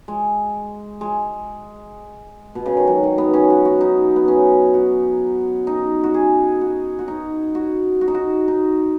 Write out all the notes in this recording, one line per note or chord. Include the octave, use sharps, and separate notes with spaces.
G#3
G#3
B2
C#3
D#3
F#3
D#3
B3
C#4
F#4
F#4
D#4
B3
C#4
F#4
D#4
F#4
G#4
F#4
F#4
D#4
F#4
F#4
D#4
F#4
D#4